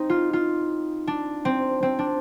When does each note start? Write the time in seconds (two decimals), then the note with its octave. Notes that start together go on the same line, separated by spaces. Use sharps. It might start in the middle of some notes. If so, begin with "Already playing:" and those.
Already playing: C4 D#4
0.10 F4
0.33 F4
1.07 D4
1.45 C4
1.83 C4
1.99 D4